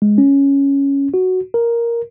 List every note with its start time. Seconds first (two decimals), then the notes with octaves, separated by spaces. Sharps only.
0.02 G#3
0.18 C#4
1.14 F#4
1.54 A#4